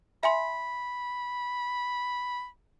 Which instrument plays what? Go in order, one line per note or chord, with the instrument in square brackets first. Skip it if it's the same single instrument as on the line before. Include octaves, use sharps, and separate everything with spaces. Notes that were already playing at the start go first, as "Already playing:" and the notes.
[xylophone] E5 G#5 C6 [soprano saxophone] B5